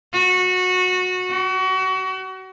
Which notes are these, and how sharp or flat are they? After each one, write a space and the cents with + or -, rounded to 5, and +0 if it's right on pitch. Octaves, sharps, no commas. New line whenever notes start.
F#4 -20
F#4 +30